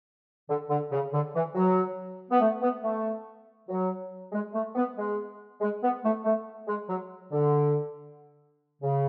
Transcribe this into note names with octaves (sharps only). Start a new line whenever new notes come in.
D3
D3
C#3
D3
E3
F#3
B3
A3
B3
A3
F#3
G#3
A3
B3
G#3
G#3
B3
A3
A3
G#3
F#3
D3
C#3